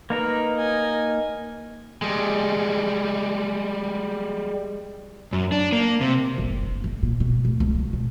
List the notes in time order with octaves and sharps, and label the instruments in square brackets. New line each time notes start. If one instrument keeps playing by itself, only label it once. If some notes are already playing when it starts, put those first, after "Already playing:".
[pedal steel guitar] A#3 D#4 A#4 [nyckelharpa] B4
[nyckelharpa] D#5 G#5
[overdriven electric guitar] G3 G#3
[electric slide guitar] F#2
D4
A#3
C3
[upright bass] G1
F#1
G2
F#1
A#2
B2
D1
C#2
F#3
B2